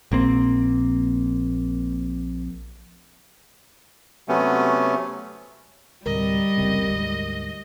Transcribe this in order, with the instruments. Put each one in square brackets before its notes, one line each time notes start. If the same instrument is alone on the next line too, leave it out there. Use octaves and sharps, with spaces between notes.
[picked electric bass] A#1 A#3 C4
[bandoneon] C3 F#3 A3 B3 C#4
[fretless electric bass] D2 A2 C3 [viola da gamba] G3 [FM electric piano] A#4 [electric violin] D#5
[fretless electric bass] F#1 C#2 C3
D2 G#2